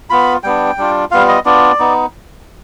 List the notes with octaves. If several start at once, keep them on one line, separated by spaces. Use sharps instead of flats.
B3 F4 B5
G3 B3 D4 G5
G3 D4 F4
G3 B3 F4 F5
D#5
B3 D4 F4 D5
B3 D#4